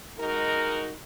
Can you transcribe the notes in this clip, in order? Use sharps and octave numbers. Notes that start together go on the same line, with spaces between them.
G#3 D#4 F#4 A#4